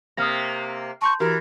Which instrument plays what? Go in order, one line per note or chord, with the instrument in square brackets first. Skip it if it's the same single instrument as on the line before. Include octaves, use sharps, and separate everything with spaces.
[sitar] C3 A#3 [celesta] D#6 F6 A#6
[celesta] A5 C6 G6 [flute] C#6
[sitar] E3 [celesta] F#4 G4 [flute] A#4